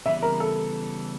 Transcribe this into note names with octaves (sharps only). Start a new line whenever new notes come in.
C#3 E3 G3 B3 E5
A#4
A4